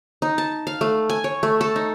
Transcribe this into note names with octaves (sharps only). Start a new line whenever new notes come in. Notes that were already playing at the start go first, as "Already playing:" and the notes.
D#4
A5
F5
A3
G#5
C#5
A3
A4
D#4